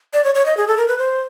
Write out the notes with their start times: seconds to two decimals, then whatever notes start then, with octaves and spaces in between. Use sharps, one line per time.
0.13 D5
0.24 C#5
0.35 C#5
0.46 D#5
0.57 G#4
0.68 A4
0.78 A#4
0.88 B4
0.99 C5